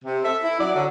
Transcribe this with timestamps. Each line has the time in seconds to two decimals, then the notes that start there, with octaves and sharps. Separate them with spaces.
0.04 C3
0.25 A4 E5
0.43 E4
0.60 F#3 D5
0.75 D3 F#3